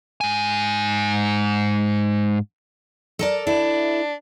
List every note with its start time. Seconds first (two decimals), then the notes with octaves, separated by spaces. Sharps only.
0.21 G#2 G#5
3.19 A4 A#4 D5
3.47 D4 E4 A4